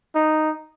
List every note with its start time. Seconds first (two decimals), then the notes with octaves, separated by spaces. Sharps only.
0.15 D#4